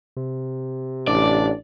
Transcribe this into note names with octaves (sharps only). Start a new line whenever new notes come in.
C3
A1 D4 D5